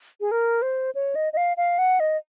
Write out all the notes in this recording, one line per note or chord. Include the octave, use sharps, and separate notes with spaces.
G#4
A#4
C5
C#5
D#5
D#5
F5
F5
F#5
D#5